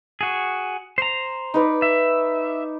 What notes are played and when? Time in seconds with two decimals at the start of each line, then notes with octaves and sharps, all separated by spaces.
0.21 F#4 G#4
0.98 C5 A#5
1.54 D#4 B4 D5
1.82 E5